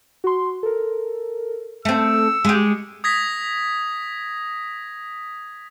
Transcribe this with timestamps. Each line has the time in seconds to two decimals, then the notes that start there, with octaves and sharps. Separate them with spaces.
0.24 F#4 C6
0.63 A4 A#4
1.85 A3 C4 E6 C#7
2.45 G#3 G4
3.04 D#6 G#6 A#6 B6